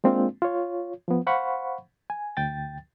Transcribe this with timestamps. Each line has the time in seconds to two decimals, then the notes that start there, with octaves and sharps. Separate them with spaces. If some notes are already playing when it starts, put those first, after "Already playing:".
0.04 G#3 A#3 C4 D4 F4
0.42 F4 C#5
1.08 F3 B3
1.27 C5 F5 F#5 B5 C#6
2.10 G#5
2.37 D2 G5 A6